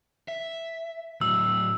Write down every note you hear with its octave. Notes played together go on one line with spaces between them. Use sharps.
E5
A2 F#3 E6